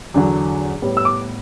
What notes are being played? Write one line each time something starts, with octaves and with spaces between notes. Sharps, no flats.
E2 D3 F#3
A2 G3 B3
E6
D6